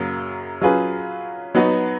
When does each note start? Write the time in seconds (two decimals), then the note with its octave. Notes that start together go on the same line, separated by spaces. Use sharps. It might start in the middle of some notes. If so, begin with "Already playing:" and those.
Already playing: F#2 C#3 F#3 A#3
0.61 F#3 C#4 F4 G#4 B4
1.55 F#3 B3 D#4 F#4 B4